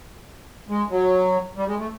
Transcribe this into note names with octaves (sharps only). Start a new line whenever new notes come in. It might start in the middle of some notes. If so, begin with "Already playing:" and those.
G#3
F#3
G3
G#3
A3